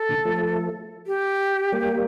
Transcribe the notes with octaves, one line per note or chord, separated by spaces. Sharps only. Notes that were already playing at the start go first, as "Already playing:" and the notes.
Already playing: A4
A#2 D3
F3 A3
G4
G3 A#3